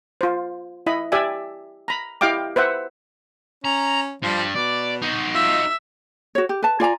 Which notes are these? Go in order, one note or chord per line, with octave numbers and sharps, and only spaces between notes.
F4 C5
E4 D#5 B5
G4 D5 E5 G#5
A#5 B5
E4 G4 D#5 F5 G5 D6
B4 C5 E5 F#5
C#4 A#5
G2 F3 G3
B2 D5
D#4 F#4
F4 E5
F#4 C#5
G4
B4 A5
F4 D5 G#5 A#5